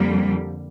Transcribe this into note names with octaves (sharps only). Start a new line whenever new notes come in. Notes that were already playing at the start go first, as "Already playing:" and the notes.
Already playing: F2 D3 G3 A#3